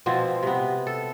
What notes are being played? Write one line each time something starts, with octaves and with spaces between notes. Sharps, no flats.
B2 F3 C4
C3 B3
A4